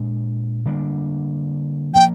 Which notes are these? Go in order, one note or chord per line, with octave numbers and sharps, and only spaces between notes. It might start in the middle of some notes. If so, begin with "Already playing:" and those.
Already playing: A#2 G#3 D4
D3 G3 A#3 D4
F3 A#3 G5